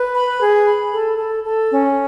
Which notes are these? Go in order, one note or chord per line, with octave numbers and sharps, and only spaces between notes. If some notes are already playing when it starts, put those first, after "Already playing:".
Already playing: B4
B5
G#4
B5
A4
A4
A4
C#4